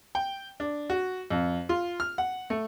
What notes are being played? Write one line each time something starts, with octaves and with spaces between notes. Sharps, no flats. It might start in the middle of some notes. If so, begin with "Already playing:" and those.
G5
D4
F#4
F2
F4
F6
F#5
A3